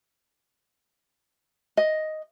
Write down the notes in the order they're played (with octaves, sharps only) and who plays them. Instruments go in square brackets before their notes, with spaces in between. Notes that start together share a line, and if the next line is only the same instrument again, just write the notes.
[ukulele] D#5